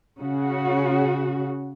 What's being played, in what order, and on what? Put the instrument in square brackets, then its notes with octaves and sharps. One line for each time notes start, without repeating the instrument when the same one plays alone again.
[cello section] C#3 F#4